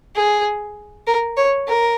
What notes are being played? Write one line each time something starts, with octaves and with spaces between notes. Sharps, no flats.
G#4
A#4
C#5
A#4